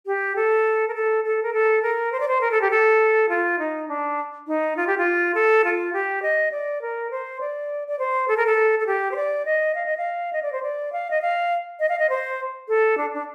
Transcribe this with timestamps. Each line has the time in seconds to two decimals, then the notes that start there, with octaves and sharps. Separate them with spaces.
0.06 G4
0.36 A4
0.88 A#4
0.95 A4
1.25 A4
1.43 A#4
1.53 A4
1.82 A#4
2.12 C5
2.20 D5
2.28 C5
2.41 A#4
2.51 A4
2.61 G4
2.71 A4
3.29 F4
3.59 D#4
3.88 D4
4.47 D#4
4.77 F4
4.87 G4
4.98 F4
5.35 A4
5.64 F4
5.93 G4
6.22 D#5
6.51 D5
6.82 A#4
7.11 C5
7.41 D5
7.88 D5
7.99 C5
8.28 A4
8.37 A#4
8.47 A4
8.79 A4
8.87 G4
9.11 C5
9.16 D5
9.45 D#5
9.75 F5
9.86 D#5
9.97 F5
10.33 D#5
10.42 D5
10.52 C5
10.63 D5
10.93 F5
11.11 D#5
11.22 F5
11.80 D#5
11.89 F5
11.99 D#5
12.10 C5
12.68 A4
12.98 D4
13.14 D4